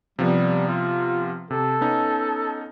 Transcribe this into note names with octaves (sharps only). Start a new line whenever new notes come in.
C3 F3 G3 B3
F4
C3 A4
B3 C#4 D#4